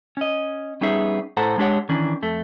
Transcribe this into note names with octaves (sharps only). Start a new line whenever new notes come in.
C#4 D#5
G3 B3 C#4 D#4 G#4 E5
A2 A4 C5 F#5 A#5
G#3 D4 G4 C#5 F#5
D#3 E3 C#4 D4
F2 A3